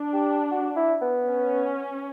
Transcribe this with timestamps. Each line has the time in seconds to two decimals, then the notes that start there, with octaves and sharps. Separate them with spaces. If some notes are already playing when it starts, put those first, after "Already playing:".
Already playing: D4
0.14 G4
0.52 F#4
0.76 E4
1.02 B3
1.27 C#4